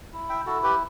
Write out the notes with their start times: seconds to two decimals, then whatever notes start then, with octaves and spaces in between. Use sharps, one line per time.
0.13 E4
0.29 E5 G5
0.46 E4 F#4 A4
0.63 G4 B4